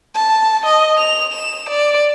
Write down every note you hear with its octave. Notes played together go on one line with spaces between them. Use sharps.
A5
D#5
F7
E7
D5